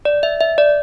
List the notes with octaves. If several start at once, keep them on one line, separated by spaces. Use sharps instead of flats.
D5
E5
E5
D5